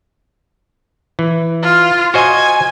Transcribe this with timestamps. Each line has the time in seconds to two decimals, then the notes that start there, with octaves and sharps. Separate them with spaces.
1.19 E3
1.63 F4
2.14 F#4 C5 D#5 G#5